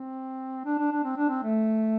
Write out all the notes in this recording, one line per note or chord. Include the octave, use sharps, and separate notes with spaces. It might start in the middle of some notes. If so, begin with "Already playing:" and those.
Already playing: C4
D4
D4
D4
C4
D4
C4
A3